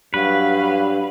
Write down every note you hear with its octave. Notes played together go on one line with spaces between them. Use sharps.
G2 F#3 B4 F5